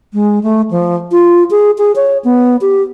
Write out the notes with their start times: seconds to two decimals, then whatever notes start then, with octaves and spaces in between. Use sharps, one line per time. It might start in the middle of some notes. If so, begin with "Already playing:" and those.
0.14 G#3
0.43 A3
0.71 F3
1.12 F4
1.51 G#4
1.78 G#4
1.96 C#5
2.24 B3
2.61 G4